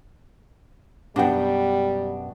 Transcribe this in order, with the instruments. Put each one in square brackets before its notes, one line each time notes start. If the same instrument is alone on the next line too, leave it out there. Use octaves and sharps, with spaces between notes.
[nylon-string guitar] F#2 B2 [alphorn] G3 [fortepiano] D4 F#4 G5